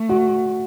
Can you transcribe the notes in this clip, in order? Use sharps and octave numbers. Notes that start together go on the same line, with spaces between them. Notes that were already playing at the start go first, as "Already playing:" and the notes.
Already playing: A3
F#4